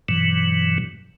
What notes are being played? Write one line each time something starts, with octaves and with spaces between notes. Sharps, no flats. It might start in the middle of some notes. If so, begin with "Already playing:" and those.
G2 B2 E3 F#3